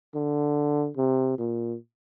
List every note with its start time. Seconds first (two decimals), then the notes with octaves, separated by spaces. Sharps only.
0.15 D3
0.97 C3
1.38 A#2